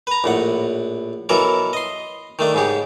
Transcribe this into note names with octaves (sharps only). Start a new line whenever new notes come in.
B4 A#5
A#1 A2 F#5
B2 E3 F#3 A4 A#4
D#5 C6
D#3 A3 D4
G#2 C#3 G4